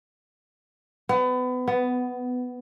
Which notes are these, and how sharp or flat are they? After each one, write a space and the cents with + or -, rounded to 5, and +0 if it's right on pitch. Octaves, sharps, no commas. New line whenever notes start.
B3 +30
B3 +10